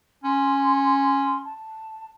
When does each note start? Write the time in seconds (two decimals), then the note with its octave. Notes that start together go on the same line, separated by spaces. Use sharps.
0.24 C#4 C6
1.44 A5